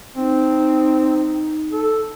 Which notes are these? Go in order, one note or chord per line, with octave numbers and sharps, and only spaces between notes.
C4 D#4
A4